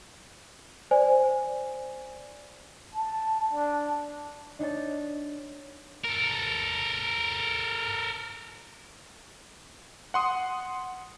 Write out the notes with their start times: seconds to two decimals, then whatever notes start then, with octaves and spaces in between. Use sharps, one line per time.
0.91 C5 D5 G#5
2.93 A5
3.53 D4
4.59 D4 D#4 C#5 A5
6.05 A4 A#4
10.14 F#5 C6 D#6